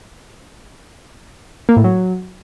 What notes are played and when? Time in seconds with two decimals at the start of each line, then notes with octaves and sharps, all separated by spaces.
1.69 A#3
1.76 A2
1.84 F#3